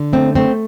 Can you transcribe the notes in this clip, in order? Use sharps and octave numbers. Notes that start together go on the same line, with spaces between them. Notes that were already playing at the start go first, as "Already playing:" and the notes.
Already playing: D3
A3 C4
A3 C4